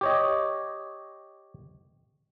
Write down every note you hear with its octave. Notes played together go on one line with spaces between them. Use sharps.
G4 C#5 D#5